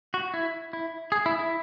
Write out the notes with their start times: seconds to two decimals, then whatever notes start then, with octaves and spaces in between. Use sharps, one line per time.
0.14 F#4
0.34 E4
0.73 E4
1.12 G#4
1.26 E4
1.39 E4